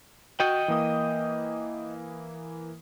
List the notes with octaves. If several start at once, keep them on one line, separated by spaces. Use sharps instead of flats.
F#4 D#5 G5
E3 A#3 D#6